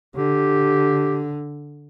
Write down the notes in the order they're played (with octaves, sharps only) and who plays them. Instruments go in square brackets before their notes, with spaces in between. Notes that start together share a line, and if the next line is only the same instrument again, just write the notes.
[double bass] D3 [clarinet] G4